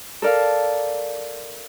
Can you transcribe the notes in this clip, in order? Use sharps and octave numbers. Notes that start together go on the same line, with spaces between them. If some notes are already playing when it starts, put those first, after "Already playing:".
A4 A#4 D5 F5